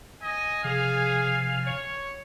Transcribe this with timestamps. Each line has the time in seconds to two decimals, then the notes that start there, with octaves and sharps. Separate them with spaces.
0.23 D#5 G#5
0.64 C3 F3 G#4 F5
1.65 C#5